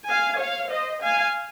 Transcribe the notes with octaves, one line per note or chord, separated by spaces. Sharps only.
F5 G#5
C#5 F5
C5 D#5
F5 G#5